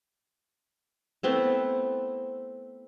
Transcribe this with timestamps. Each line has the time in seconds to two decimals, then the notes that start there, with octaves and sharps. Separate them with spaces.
1.23 A3 B3 C4 E4